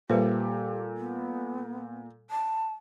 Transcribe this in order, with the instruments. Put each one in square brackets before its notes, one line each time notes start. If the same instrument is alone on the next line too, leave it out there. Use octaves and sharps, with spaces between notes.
[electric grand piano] A#2 A4 [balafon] G3 B4 C5 [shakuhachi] G4
[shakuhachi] B3
A5